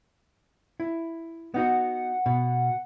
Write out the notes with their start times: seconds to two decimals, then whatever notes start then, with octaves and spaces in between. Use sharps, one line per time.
0.80 E4
1.54 B3 D#4 F#4 F#5
2.26 B2